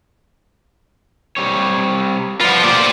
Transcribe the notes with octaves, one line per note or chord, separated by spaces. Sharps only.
G3 C4 C#5
F3 F4 B4 D5 F#5
A#2 F4 G4 C5 D5